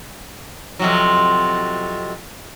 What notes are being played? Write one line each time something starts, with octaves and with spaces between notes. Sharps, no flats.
F2 C3 F#3